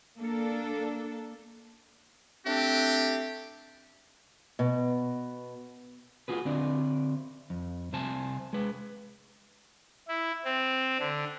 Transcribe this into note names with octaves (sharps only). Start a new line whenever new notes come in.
A#3 D4 A4
A3 C4 D4 G4
B2
F4 F#4 G#4 B4
D3 C4 D4 D5
F2
C2 C3 C5 G#5 A5
G#3 B4
E4
C4
D3